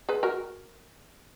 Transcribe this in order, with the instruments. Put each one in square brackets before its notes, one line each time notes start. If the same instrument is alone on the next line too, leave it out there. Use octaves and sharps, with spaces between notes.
[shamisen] G#4 B4
F#4 A#4